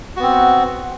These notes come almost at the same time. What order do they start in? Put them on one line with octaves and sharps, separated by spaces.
F#4 B3 C4